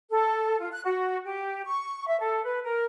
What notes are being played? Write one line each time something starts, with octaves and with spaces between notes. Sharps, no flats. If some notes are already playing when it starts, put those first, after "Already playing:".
A4
F4
F#6
F#4
G4
C#6
E5
A4
B4
A#4